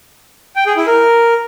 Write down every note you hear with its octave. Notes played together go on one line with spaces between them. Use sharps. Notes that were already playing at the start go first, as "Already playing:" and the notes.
G5
G#4
E4
A#4